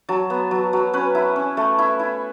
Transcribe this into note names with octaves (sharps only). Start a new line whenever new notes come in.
F#3 A5
B3
F#3
F#3
C#4 B4
E4
C#4
A3
E4
E4